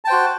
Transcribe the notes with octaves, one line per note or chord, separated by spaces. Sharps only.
F#4 C5 G5 A5